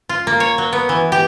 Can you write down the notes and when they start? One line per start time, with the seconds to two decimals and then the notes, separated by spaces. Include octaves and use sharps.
0.09 F4
0.27 A#3
0.40 C#5
0.58 F#3
0.73 B3
0.89 E3
1.12 G4